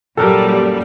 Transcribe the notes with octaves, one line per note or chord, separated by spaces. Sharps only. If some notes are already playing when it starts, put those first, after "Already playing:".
F#2 A#2 G3 A4 A#4